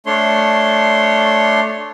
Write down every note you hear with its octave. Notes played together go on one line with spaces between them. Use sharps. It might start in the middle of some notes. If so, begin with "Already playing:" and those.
A3 D4 C#5 C6